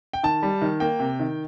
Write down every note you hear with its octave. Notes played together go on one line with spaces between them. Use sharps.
G5
D#3 A5
G3
D#3
A#3 G5
C3
D#3